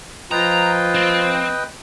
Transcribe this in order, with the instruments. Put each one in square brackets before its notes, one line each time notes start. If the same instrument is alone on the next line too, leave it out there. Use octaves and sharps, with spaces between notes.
[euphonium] F3 [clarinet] F4 [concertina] B4 D#5 G5 [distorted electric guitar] A#5
[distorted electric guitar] C4